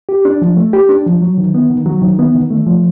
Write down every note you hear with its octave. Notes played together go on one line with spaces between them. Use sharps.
G4
D4
F3
A3
G4
D4
F3
F#3
D#3
B3
D#3
F#3
D#3
B3
D#3
A3
F3